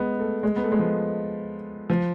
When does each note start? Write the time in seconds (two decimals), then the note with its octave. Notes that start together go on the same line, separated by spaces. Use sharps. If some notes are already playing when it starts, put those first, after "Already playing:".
Already playing: G#3 B3
0.19 A3
0.43 G#3
0.56 B3
0.63 A3
0.72 G#3
0.79 F3
1.90 F3